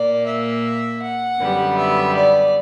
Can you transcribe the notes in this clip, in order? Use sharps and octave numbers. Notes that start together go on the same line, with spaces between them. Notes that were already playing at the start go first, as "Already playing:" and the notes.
Already playing: A#2 A#3 D5
E5
F#5
F#2 D3 G3 B3
E5
D5